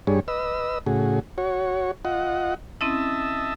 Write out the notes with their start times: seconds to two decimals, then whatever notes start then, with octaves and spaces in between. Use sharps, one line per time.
0.07 G2 G3 D4 G#4 C#5
0.28 B4 D#5 E6
0.86 A2 C#3 F#4 G#4
1.38 F#4 C#5
2.05 F4 D#5 F#5
2.81 C4 C#4 E4 D#5 E5 A5